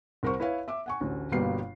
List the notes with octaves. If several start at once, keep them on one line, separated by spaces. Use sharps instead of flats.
C2 A#4 C5 C#6
E4 B4 C#5 F5
E5 D6
F#5 G#5 C#6
A1 D2
G1 B2 G3 A#3 B3 C7